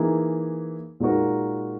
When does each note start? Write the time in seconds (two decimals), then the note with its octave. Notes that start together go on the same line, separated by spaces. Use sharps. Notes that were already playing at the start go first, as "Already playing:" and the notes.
Already playing: E3 A#3 D#4 G#4
1.00 A#2 G#3 D#4 F#4 A#4